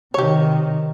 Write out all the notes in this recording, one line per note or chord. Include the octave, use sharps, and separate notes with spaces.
C3 D#3 G4 C#5